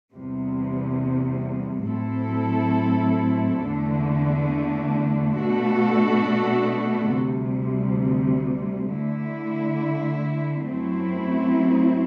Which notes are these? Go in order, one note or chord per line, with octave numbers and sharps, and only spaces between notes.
E2 C3 G3
A2 F#3 C4 E4 A4
E2 D3 A3 D4
B2 A3 D4 F#4 A4
D2 C3 G3
D3 A3 E4
F#2 F#3 A3 C4 E4